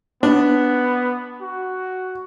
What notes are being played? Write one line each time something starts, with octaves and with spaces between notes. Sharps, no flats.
B3 D4
F#4